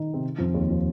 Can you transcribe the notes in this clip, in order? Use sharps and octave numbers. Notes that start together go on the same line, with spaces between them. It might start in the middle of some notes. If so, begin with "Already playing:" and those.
Already playing: D#3 D#4
C3 C4
F2 F3
D#2 D#3
F3